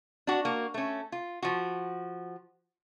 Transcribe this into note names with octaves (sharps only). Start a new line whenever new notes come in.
D4 F#4
A#3 F#4
A3 C#4
F4
F3 F#4